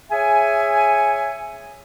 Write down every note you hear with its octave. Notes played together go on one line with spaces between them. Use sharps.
G#4 C#5 E5 G#5